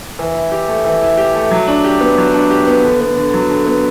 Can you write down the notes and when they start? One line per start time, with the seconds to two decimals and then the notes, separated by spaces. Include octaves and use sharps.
0.19 E3
0.35 E4
0.52 G4
0.68 A3
0.85 E3
1.02 E4
1.17 G4
1.34 A3
1.51 F#3
1.68 D4
1.84 G4
2.01 B3
2.18 F#3
2.34 D4
2.51 G4
2.67 B3
2.84 D3
3.01 B3
3.17 D3
3.34 F#3
3.50 D3
3.66 B3